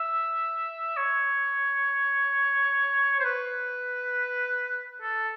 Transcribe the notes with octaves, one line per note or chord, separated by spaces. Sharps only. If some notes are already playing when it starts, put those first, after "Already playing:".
Already playing: E5
C#5
C5
B4
A4